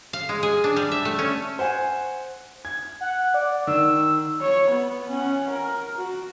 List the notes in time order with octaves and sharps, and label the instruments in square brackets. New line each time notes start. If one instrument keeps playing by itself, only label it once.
[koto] F5
G#3
G#4
D4
G3
E5
A3
C#4
[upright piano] C5 F#5 G#5
G#6
[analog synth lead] F#5
D5
[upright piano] D#3 [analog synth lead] E6
[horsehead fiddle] C#5
B3
C#4 F#5
A#4
F#4